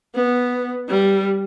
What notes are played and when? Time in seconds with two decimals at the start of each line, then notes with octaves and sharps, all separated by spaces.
0.15 B3
0.89 G3